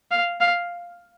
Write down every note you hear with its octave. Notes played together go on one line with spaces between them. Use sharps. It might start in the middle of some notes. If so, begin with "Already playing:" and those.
F5
F5